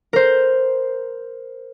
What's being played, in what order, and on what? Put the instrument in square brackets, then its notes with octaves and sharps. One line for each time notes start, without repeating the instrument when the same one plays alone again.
[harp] A#4 C5